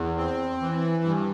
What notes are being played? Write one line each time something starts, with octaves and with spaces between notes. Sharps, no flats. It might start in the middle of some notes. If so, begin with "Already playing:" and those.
Already playing: E2
C4
E3
G2